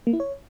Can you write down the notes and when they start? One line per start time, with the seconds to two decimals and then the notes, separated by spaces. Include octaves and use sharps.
0.07 A#3
0.13 E4
0.20 C#5